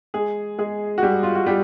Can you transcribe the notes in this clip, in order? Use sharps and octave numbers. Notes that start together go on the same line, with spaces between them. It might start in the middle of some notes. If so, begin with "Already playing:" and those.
G#3 G#4
G#3 G#4
F#4
G3 G4
F4
F#4
G3 G4